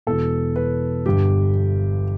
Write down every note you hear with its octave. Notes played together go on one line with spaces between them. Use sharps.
E1 E2 B2 A4
B4
G1 G2 D3 G4